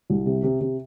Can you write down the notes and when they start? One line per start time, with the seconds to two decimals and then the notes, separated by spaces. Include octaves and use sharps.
0.10 C2
0.26 C3
0.43 C3
0.61 C3